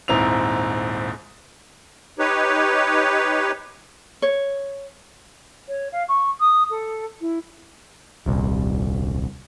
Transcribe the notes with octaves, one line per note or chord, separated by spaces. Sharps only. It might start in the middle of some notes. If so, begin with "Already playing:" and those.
D#1 G#2 C4 E4 F7
D#4 G4 B4 C#5
C#5
C#5
F5
C#6
D#6
A4
E4
D#1 C2